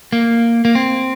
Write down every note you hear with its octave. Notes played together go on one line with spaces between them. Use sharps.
A#3
A#3
C4